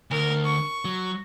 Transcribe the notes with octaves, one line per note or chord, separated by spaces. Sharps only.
D2 A#4
C#6
F#3